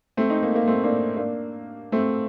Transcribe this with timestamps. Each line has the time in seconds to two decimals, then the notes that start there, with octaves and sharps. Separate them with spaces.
0.17 A3 C4
0.29 C4 D#4
0.43 A#3
0.55 A#3
0.67 A3 C4
0.84 A#3 D4
1.17 A#3 D4
1.92 A3 C4